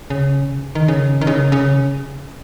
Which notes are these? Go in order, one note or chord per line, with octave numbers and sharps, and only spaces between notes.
C#3
D#3
C#3
D#3
C#3
C#3